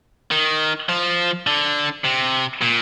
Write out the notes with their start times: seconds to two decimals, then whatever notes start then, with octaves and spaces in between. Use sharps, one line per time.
0.31 D#3
0.89 F3
1.47 D3
2.05 C3
2.62 A#2